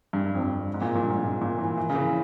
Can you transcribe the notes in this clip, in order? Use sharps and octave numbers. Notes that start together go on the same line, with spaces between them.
G2
F2
G2
G#2
A#2
A#2
G2
G#2
A#2
A#2
E3
E3
C#3
E3